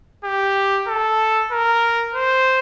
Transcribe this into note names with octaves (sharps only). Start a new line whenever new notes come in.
G4
A4
A#4
C5